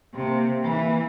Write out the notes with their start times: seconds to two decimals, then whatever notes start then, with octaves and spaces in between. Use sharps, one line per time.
0.14 C3 A#3
0.63 E3 A#3